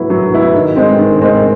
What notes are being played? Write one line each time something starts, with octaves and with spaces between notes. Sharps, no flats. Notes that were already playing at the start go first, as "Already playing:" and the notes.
Already playing: F#3 B3 E4
F#3
B3 E4
D#3
G#3 C4
D#3
G#3 C4